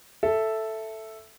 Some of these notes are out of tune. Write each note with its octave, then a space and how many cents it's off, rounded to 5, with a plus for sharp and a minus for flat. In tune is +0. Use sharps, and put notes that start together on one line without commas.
A4 +0 E5 +0